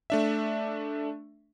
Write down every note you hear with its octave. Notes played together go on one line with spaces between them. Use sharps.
A3 D4 E5